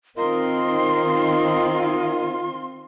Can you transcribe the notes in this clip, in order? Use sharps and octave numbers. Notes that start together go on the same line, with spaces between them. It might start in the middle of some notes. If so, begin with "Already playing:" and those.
D#3 C4 F4 A#4 D#5 C6